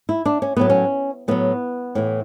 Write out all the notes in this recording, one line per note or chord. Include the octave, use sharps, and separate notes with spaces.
E4
D4
C#4
A2 F#3 B3
C#4
A2 F#3 B3
A2 E3